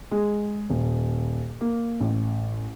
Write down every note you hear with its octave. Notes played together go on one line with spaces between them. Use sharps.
G#3
D#1
A#3
A1